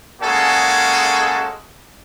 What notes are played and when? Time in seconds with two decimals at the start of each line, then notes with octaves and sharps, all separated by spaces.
0.22 G#3 A#3 C#4 F#4 G#4 A4